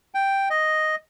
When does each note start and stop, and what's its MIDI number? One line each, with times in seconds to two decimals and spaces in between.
0.14 0.49 79
0.50 0.95 75